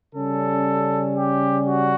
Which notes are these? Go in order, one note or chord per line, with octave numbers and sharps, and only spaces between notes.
C#3 G3 C#4 A4
G4
F#4